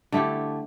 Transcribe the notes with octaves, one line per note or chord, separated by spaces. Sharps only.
D3 A3 E4 G4